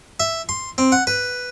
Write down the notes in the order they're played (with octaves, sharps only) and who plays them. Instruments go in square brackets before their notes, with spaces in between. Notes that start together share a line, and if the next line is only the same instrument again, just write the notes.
[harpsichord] E5
C6
C4
F#5
B4